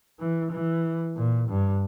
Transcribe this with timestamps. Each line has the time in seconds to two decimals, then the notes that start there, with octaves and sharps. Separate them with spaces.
0.20 E3
0.51 E3
1.17 A#2
1.49 G2